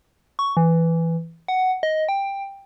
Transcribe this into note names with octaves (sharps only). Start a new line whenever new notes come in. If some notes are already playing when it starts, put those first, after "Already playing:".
C#6
E3
F#5
D#5
G5